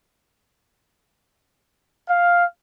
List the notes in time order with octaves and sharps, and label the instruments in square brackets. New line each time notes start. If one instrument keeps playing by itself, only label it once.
[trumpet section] F5